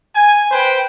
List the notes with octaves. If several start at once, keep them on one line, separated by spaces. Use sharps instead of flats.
G#5
B4 C5 G5